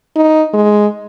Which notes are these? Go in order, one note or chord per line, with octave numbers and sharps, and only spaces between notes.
D#4
G#3